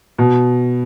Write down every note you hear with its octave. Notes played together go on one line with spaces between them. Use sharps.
B2